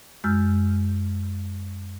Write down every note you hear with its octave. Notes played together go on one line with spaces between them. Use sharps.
F#2 G#3 E6 F6 G6